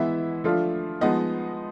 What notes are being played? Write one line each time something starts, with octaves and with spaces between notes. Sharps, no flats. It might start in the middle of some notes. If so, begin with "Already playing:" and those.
Already playing: E3 G#3 B3 E4 E5
F3 A3 D4 F4
F3 G#3 B3 D#4 D#5